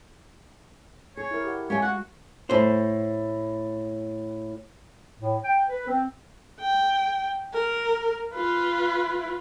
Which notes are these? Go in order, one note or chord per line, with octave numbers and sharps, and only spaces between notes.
G#4 C#5
E4 A#4
G4 F#5
G#3 G4 C#5 E5 F5 G#5
F#4 F#5
A2 C5
A2
G5
B4
C4
G5
A#4
F4 B4